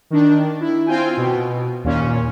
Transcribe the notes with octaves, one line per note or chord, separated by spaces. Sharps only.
D#3 D4
E4
C4 F4 G5 G#5
B2
D#2 A#2 C#4